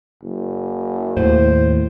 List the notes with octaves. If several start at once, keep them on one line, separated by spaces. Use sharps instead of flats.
F#1
D#2 A2 C5